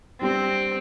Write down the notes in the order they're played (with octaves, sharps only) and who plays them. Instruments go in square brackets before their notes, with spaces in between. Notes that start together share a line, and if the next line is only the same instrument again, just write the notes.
[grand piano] G3 D4 G4 [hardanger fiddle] C4